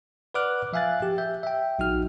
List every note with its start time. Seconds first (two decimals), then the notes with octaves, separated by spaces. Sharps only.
0.34 B4 D5 F#5 D6 F6 F#6
0.73 F3 E5 F5 G#5 F#6 A6
1.02 G4
1.18 E5 G6
1.43 E5 G5
1.79 A#1 F#3 D#4 F#4 F6